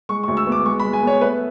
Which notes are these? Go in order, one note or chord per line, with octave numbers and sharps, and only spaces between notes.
G#3 C#6
C#6
D2
E6
B3
D6
G#3 C#6
B5
G#3
G#5
B3 C#5
A3 B4